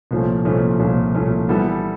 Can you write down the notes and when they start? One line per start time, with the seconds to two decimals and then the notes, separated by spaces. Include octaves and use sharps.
0.11 C2 A#2 F3 A3 C#4
0.45 C2 A#2 F3 A3 C#4
0.79 C2 A#2 F3 A3 C#4
1.15 C2 A#2 F3 A3 C#4
1.48 E3 G3 B3 E4 A4